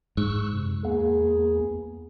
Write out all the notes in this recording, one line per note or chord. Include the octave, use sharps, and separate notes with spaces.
G#2 C#6 E6 F#6
F#2 C3
E2 A#3 B3 G#4